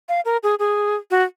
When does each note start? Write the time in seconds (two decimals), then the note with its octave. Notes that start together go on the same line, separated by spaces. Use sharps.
0.09 F5
0.25 A#4
0.43 G#4
0.59 G#4
1.11 F#4